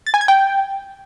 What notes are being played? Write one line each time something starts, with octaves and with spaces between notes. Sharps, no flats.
A6
G#5
G#6
G5